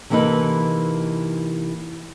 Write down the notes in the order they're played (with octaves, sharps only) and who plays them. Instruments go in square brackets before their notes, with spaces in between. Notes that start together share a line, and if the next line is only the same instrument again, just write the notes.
[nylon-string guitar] C3 E3 A#3 D#4 A4 B4